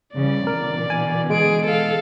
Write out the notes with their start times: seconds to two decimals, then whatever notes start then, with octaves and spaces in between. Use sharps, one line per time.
0.16 C#3 E3 G3 D5
0.47 B2 D3 E3 A#4
0.90 G#5
1.30 G#3 G#4 D7
1.65 A4 F5